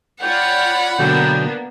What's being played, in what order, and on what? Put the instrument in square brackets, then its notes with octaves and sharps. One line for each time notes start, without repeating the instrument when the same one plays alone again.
[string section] F4 C#5 D5 [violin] F#5 B5 [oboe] G5
[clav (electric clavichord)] B2 D3 F#3 [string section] A#3 B3 D4 [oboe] G5